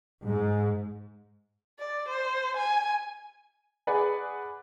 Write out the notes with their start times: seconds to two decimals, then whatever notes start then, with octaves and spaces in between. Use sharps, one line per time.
0.24 G#2
1.79 D5
2.09 C5
2.57 G#5
3.87 G#4 B4 D5 F#5 G#5